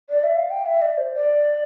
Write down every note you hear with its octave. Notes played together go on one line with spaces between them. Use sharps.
D5
E5
F5
G5
E5
D5
C5
D5